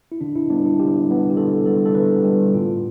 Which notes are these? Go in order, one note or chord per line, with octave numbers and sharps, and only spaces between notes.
E4
D3 D4
E4
G3 B3 D4
E4
D3 G4
G3 B3
G4
D3 A4
G3 B3 A4
A4
D3 B4
G3 B3 G4
A2 F4